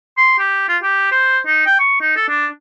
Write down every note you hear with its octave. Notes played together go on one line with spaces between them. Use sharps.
C6
G4
F4
G4
C5
D#4
G5
C#6
D#4
A4
D4